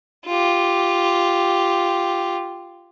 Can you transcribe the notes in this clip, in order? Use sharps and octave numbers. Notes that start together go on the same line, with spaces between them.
F4 G4